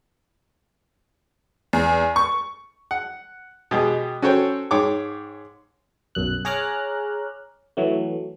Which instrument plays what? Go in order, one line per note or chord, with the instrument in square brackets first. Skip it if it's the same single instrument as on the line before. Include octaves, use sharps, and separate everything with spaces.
[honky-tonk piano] E2
C#6
[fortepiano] F#5
B2 G#3 G4 G#4
C#4 F#4 A4 C5 C#5 G5
G#2 G#4 C#5 G5 D6
[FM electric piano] B1 F#2 F#6
G#4 C#5 A#5 D6 F6 F#6
E3 F#3 A3